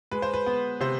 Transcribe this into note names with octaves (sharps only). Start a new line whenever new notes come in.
G#3 B4
C5
B4
B3
C3 C5